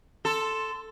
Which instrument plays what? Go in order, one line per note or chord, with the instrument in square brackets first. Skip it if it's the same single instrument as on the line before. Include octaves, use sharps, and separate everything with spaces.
[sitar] A4 [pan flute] C6